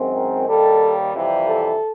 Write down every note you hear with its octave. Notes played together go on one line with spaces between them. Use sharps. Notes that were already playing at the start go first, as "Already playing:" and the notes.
Already playing: F#2 D#3 G#3 C4
A#4
D#2 D#3 G3 A4
F2 C3 E3 G3
A4